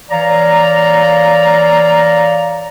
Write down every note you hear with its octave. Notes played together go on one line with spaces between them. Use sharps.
E3 C#5 D5 F5 A#5